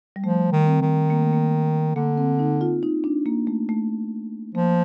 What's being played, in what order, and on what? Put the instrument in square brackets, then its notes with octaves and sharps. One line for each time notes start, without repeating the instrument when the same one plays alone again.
[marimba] G3
[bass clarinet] F3 [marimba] A3
[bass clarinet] D#3
[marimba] C4
[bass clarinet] D#3
[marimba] A#3
A3
A#3
[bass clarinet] D3 [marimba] A#3
[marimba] C4
D#4
F4
D#4
D4
A#3
A3
A3
[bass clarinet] F3 [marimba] A#3